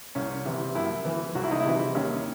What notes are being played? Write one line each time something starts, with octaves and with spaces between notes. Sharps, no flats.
C2 C#4
C3 E3
F#2 E4
E3
C2 F#4
E4
D#4
E4
C3 E3
D#2 C#4